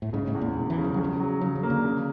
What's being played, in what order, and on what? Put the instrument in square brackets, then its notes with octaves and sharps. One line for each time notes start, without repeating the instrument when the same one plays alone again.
[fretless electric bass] A2
[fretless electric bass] G#2 [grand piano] C#3
[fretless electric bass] A2
[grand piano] E2
[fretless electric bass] A#2
[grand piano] E1
[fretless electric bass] E3
[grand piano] C#3
[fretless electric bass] F3
[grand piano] C#3 [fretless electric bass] F#3
[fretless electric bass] F3
[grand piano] F#3
[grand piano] C#3 [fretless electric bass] F#3
[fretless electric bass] F3
[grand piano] A#3
[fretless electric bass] D3
[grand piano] C#3